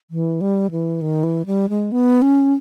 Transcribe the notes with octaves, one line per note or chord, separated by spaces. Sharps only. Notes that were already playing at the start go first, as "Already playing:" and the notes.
E3
G3
E3
D#3
E3
G3
G#3
B3
C#4